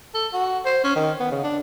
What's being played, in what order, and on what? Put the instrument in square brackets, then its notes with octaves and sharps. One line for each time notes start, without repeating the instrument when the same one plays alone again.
[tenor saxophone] A4
F#4
C5
C#4
D#3
B3
C#3
D4